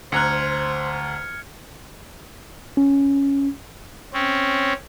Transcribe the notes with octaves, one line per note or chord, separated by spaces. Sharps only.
D2 C5 A#5 F6 F#6 G#6 C#7
C#4
C4 C#4